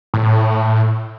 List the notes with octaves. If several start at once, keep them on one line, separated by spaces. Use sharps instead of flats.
A2